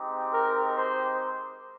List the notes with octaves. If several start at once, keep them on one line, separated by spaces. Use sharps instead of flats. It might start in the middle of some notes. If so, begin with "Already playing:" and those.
Already playing: G#3 C4 D#4 G4
A#4
C5